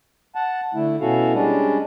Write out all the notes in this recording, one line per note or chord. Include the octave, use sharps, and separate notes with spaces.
F#5 A5
D3 A3 E4
B2 C#4 E4 F#4 A4 F5
G3 G#3 C#4 D4